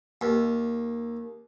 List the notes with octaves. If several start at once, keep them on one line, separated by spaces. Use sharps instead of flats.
D#2